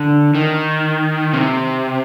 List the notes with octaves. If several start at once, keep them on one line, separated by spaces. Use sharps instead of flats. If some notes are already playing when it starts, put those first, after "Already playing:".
Already playing: D3
D#3
C3